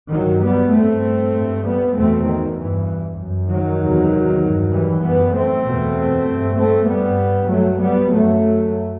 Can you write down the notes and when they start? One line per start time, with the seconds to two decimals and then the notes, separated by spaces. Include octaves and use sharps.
0.12 G2 D#3 F#3
0.44 G3 B3
0.74 G2 A3 C4
1.36 G2
1.66 G3 B3
1.97 E2 B2 A3 C4
2.28 D#3
2.59 G2 E3
3.19 F#2
3.51 D#3 F#3
3.81 E2 C3
4.43 G2
4.73 E3 G3
5.04 F#2 G3 B3
5.35 A3 C4
5.65 E2 B2
6.27 G2
6.57 A3 C4
6.88 G2 G3 B3
7.49 G2 F#3 A3
7.81 G3 B3
8.10 F#2 F#3 A3